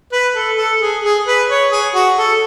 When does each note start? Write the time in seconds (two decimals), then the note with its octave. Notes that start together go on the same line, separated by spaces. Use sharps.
0.12 B4
0.35 A4
0.58 A4
0.82 G#4
1.04 G#4
1.27 B4
1.50 C#5
1.72 G#4
1.95 F#4
2.17 A4